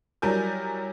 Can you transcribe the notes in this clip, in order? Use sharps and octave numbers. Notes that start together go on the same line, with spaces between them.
F#3 G3 E4 A#4 G#5 G6